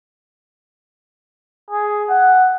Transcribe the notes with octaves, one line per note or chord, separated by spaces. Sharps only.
G#4
F#5